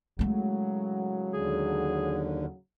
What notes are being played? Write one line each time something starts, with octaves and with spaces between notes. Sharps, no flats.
A2 C#3 F#3 G#3 A3
D#2 D3 G#4